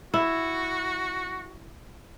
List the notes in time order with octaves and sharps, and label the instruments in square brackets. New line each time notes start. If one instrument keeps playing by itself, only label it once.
[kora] E4 [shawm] F#4